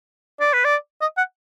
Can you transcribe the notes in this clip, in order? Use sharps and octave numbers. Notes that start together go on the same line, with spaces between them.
D5
B4
D5
D#5
F#5